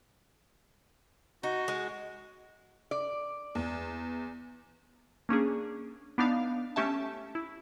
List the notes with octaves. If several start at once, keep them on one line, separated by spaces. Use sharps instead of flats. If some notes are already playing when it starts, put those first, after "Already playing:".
D#4 F#4
G#3
D5
E2
A#3 C#4 D4 G#4
B3 D4 D#4 F5
A3 C#4 G4 E5 A5
E4